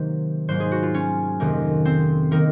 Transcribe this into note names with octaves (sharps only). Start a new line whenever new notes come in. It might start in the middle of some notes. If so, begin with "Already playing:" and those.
Already playing: C3 D#3 F#3 A#3 C5
G#2 F#3 A#3 C5
G#4
F#4
F4
C#4
F2 C3 D#3 A#3
C4
D#3 A#3 A#4